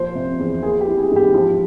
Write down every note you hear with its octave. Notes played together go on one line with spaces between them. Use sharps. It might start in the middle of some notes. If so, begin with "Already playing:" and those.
Already playing: A#2 F3 C5
C3
E2
A#3 G#4
G4
E3
G#4
G#2
G4
F3